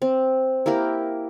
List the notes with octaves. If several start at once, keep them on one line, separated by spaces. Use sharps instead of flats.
C4
A#3 E4 G4 A#4